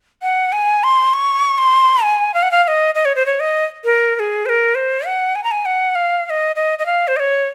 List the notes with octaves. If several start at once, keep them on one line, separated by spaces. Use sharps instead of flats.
F#5
G#5
C6
C#6
C6
G#5
F5
F#5
F5
F5
D#5
D#5
C#5
C5
C#5
D#5
A#4
A#4
G#4
C5
A#4
C5
F#5
G#5
A#5
G#5
F#5
F5
F5
D#5
D#5
D#5
F5
C5
D#5
C#5